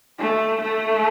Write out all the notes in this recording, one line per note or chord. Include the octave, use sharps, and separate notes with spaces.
A3
A3